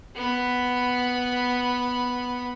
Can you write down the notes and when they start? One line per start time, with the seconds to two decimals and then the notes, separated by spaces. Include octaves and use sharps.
0.16 B3 B5